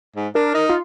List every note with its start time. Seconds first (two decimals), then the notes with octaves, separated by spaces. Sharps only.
0.16 G#2
0.35 D4 A#4
0.54 D#4
0.69 F4